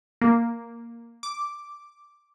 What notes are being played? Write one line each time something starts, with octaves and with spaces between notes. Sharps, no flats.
A#3
D6